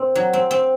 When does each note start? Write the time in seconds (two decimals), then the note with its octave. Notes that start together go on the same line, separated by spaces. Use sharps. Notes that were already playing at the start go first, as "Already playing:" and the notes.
Already playing: A#2 C4
0.15 F#3
0.33 C4
0.51 C4